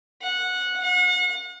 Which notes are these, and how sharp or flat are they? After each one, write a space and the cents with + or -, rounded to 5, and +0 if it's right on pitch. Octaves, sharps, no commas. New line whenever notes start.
F#5 -15
F#5 -40